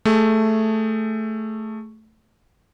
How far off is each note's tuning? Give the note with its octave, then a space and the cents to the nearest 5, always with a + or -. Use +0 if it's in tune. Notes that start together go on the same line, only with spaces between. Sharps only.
A3 +0 G#4 +0